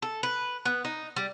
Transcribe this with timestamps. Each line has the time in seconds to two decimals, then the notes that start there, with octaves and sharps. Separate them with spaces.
0.02 A4
0.23 B4
0.65 B3
0.85 D#4
1.16 G3